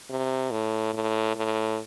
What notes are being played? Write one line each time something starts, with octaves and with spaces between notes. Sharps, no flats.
C3
A2
A2
A2